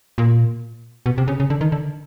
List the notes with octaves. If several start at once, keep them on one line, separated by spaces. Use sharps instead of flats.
A#2
B2
C3
C#3
C#3
D3
D#3
D3